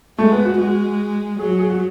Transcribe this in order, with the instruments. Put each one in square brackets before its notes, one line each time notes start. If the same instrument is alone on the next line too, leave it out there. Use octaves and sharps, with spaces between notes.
[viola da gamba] G#3 [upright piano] A3
[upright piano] B3
F#4
[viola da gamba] G#3 [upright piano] F#4
[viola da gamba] F#3 [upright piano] G#4
[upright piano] F#4
G#4
F#4